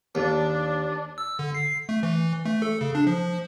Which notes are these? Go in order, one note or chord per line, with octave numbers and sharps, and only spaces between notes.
D#2 D4
E6
D3
C7
A3
E3
A3
A4
C#3
D4
F3